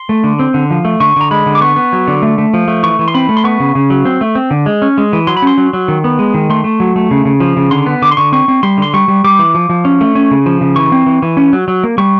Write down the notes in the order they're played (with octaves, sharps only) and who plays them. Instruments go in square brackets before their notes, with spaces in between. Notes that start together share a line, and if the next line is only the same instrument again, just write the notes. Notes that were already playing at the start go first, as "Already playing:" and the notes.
Already playing: [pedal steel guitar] C6
A3
D3
C4
D3
F3
A3
D3 C#6
D3 A#5
G#3 B5
D3
D6
B3 C#6
B3
F#3
D3
A3
A3
F3
A3
E3 C#6
E3
C6
C4 B5
A3
C6
B3 C#6
C#3
C#3
F#3
C4
A3
C4
D3
G#3
C#4
G#3
E3
F#3 C6
B5
C#4 C6
F#3
F#3
D#3
B3
G#3
D#3
A3 C6
A3
F#3
A3
C#3
C#3
F3
C#3
D3 C6
B3
D3 D6
C6
D3 C#6
C4 C#6
C4
G3 C6
D3 C6
G3 C#6
G3
G3 D6
E3
F3
F3
C#4
A3
C#4
C#3
F3
C#3
E3 C#6
C4
E3
E3
C#4
F#3
F#3
A#3
G3 C#6